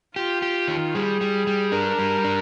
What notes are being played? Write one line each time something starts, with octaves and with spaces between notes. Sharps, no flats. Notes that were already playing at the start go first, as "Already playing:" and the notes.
F4 G4
G4
D#3
G3 G#4
G3
G3
D4 A#4
G3
D4